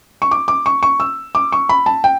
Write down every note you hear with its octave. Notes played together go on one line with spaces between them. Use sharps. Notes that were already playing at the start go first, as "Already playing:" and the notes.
C#6
D6
D6
C#6
C#6
E6
D6
C#6
B5
A5
G5